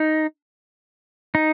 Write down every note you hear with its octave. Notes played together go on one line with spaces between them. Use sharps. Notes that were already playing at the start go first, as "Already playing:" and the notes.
Already playing: D#4
D#4